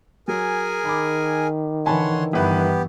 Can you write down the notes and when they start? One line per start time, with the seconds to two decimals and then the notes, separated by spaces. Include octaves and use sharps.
0.28 F#3 G#4 A#4 G#5
0.85 D#3 B5 D6
1.86 D3 E3 C#5 F#5 G#5 A5 B5 C6
2.33 G1 G2 E3 B3 E4 G4 B4